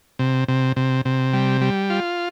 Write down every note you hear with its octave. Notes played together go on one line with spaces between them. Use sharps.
C3
C3
C3
C3
G3
G3
F4